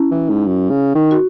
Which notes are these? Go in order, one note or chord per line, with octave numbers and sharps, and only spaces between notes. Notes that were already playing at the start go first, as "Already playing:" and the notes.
Already playing: C#4 E4
E3
G#2
F#2
C#3
D#3
F#4